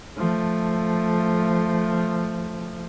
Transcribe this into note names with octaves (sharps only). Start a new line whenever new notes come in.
F3 A3